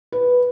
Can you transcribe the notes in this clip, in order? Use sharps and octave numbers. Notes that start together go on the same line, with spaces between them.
B4